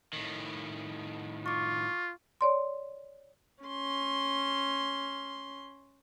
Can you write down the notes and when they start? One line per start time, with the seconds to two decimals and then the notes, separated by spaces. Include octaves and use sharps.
0.13 A2 D#3
1.46 F4 C#6 D6
2.41 C#5 D5 C6
3.63 C#4 C6